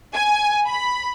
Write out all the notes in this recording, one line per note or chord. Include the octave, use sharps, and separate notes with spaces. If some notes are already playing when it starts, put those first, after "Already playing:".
G#5
B5